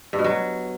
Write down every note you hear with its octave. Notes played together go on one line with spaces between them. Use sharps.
G2
B2
F#3